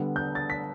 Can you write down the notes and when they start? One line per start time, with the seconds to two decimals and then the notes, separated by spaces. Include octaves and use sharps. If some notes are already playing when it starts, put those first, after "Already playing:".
Already playing: D3 G3 B3
0.16 G6
0.35 A6
0.50 B6